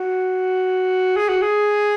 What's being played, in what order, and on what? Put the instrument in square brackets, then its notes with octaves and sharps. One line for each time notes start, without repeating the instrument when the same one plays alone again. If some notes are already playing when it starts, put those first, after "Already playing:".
Already playing: [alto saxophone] F#4
G#4
F#4
G#4